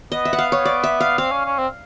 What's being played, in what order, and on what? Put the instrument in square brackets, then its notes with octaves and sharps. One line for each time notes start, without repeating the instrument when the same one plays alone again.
[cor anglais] B3 [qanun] D#5
[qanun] E5
F#5
F5
C#5
D5
E5
F5
[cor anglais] C4 [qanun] F5
[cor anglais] C#4
C#4
C4